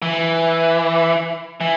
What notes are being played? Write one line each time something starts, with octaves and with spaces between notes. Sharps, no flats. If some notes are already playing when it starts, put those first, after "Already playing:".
E3
E3